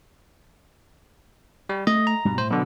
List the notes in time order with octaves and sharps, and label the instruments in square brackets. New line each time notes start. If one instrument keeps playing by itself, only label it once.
[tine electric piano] G3
[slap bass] A3 [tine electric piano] D#5
[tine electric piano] A#5
[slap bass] G2 B2 G3
[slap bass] A2 [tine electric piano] C5
[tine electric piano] B2 D3 [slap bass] F#3